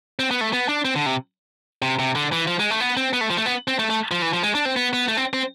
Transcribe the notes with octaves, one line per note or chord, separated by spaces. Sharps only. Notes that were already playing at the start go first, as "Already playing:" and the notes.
C4
B3
A3
B3
D4
C4
D3
C3
C3
C3
D3
E3
F3
G#3
A3
B3
C4
B3
A3
F3
A3
B3
C4
A3
A3
F3
E3
F3
G#3
D4
C4
B3
B3
A3
C4
C4